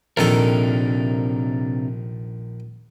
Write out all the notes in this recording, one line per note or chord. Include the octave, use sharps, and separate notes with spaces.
A#1 C3 D#3 D4 A4 A#4